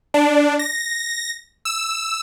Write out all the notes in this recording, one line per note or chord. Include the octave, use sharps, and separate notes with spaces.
D4
A#6
E6